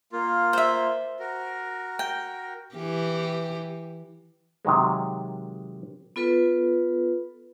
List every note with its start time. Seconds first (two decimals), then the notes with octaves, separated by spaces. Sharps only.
0.12 A#3 F4
0.53 C5 E5
1.20 F#4 A#4
1.99 G5
2.75 E3 G4
4.65 C3 D#3 F#3 G#3
6.16 B3 F4 A4 B4